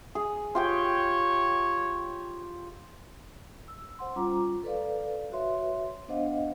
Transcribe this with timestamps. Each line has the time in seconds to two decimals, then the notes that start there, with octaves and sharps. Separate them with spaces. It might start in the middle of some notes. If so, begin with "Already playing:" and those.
0.15 G#4
0.55 F4 G4 C#5 G5
3.68 E6
3.99 C5 F#5 C6
4.16 G3 C#4 F4 A#5 D6
4.64 A4 B4 D5 F5
5.32 F#4 B4 C#5 E5 C6
6.08 B3 D4 C5 D#5 F5 F#5